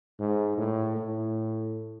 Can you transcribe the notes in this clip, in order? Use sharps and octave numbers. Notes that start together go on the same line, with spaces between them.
G#2
A2
A2